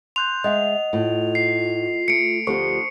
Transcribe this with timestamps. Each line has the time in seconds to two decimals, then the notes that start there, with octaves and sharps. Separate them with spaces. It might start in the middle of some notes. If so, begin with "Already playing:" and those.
0.16 C6 F#6 G6 F7
0.44 G#3 D#5 E5 F#5
0.93 A2 F4
1.35 C7
2.08 A3 C#7 D7
2.47 D2 F3 F4 G4 A4 C5 C#6